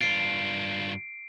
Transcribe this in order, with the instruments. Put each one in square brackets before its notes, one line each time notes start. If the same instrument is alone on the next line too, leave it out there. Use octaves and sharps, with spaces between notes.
[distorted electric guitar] G2 F4 [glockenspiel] C7 D7